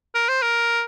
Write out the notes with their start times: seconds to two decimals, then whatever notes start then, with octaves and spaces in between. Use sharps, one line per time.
0.15 A#4
0.29 C5
0.42 A#4